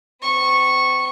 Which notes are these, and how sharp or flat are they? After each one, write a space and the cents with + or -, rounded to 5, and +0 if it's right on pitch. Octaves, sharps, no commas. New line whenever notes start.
C4 -40 C#6 -10